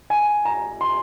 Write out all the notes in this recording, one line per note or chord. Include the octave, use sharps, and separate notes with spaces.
G#5
A#5
C6